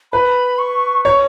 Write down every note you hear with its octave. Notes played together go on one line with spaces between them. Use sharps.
B4 B5
C#6
C#5 C#6